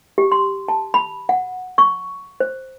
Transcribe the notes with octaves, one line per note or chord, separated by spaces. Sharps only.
G4
C6
A5
B5
F#5
C#6
C5